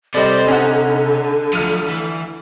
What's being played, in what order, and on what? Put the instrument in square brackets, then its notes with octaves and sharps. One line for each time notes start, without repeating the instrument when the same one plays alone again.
[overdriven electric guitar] C3 [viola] G3 C5 [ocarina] A4 [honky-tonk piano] D5 D#5
[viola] D3 [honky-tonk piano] C#4 D#4 F#5
[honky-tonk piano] D2 F6 D#7 [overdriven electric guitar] F3 F#3
[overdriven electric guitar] E3